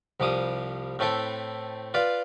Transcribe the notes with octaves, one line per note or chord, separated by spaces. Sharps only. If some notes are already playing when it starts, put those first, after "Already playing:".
C2 F3 G3 D6 D#6
A2 A3 C4 E4 A4 G5
F4 B4 D5 F5